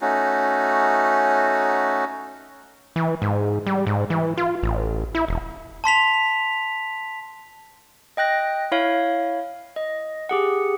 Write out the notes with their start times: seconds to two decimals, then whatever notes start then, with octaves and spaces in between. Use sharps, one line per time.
0.01 A3 C#4 D#4 F#4
2.96 E3
3.22 G#2
3.67 G3
3.87 G#2
4.10 E3
4.37 F4
4.63 A1
5.15 E4
5.28 E1
5.84 A5 C6 B6 F7
8.17 D#5 G5 F#6 A#6
8.72 E4 C#5 F5
9.76 D#5
10.29 G4 G#4 F#5